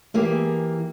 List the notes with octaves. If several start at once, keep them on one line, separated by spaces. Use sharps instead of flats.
E3 A#3 G4 G#4